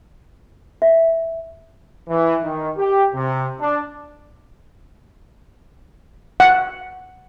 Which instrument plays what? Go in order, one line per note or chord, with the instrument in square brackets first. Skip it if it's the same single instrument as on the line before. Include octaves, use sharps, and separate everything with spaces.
[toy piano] E5
[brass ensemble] E3
D#3
G4
C3
D4
[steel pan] F#5